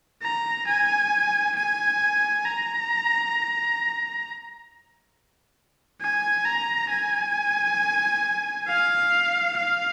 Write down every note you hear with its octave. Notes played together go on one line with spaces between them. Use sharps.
A#5
G#5
G#5
A#5
G#5
A#5
G#5
F5
F5